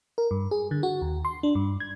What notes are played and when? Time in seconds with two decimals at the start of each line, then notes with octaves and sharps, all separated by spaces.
0.18 A#4
0.31 G2
0.51 G#4
0.71 D3
0.83 F#4
1.02 D#2
1.25 C6
1.43 D4
1.55 G2
1.80 G#6